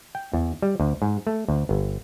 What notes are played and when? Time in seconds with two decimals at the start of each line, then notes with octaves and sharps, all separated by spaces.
0.15 G5
0.33 E2
0.62 G3
0.80 D2
1.02 G#2
1.27 A3
1.48 D2
1.69 G1